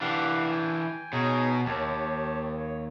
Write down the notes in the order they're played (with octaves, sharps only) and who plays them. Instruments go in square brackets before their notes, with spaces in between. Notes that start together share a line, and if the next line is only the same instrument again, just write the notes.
[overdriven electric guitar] E3 D4 [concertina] G4 F5 F#5
[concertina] G5 G#5
[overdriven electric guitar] B2 [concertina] D#4 G#4 C#5
[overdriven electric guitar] D#2 [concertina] G4 C#5 A5
[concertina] C#5